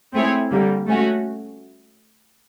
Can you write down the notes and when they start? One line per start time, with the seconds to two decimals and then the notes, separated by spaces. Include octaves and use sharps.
0.13 A3 C4 E4 G#4 C#5
0.50 D3 G3 A#3
0.87 A3 C#4 F#4